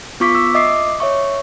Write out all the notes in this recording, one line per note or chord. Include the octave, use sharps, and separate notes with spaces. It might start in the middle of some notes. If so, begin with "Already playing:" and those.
B3 F4 C#6 D6 B6
E6
D#5 E5 D6 D#6 C7
C#5 E5 C#6